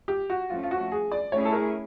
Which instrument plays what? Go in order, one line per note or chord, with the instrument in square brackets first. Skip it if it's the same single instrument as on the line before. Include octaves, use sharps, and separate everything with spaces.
[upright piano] G4
F#4
[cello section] F3 A3 C#4 [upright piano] F4
[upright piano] F4
F#4
G#4
D5
[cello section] A3 C#4 E4 G#4 [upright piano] C#5
[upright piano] A4
A#4